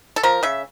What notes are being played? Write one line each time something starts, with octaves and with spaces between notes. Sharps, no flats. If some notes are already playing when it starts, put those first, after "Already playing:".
A4
F3 A#4
C#3 E5